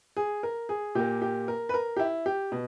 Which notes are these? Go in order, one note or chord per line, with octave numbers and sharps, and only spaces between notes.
G#4
A#4
G#4
A#2 A#3 G4
G4
A#4
B4
A#4
G4
E4
G4
B2